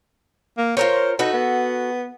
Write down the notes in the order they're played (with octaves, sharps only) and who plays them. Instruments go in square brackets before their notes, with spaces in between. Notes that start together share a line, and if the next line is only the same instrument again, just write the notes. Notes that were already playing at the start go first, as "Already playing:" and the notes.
[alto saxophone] A#3
[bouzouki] F4 A#4 C#5 [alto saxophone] C5
[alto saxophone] D#4 [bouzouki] F#4 A4 B4
[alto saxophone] B3